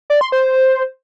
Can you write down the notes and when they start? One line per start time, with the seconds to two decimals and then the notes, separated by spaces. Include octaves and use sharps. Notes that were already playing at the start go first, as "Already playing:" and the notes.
0.10 D5
0.21 C6
0.32 C5